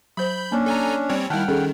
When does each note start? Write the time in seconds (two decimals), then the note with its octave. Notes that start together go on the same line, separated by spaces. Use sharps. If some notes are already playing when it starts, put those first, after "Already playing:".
0.17 F#3 C5 B5 G6
0.52 A#3 C#4 D4
0.66 A4 G#5 A#5
1.09 G3 C4 C#5
1.30 D#3 G3 E4 F#5 G5 A5 F6
1.48 D#3 C#4 G#4 A4